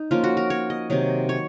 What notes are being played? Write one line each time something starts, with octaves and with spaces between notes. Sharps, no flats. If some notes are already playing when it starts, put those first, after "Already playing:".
Already playing: D#4
F3 A#3 C#4 F4
F#4
A#4
C#5
D#5
C3 D#3 F#3
C#5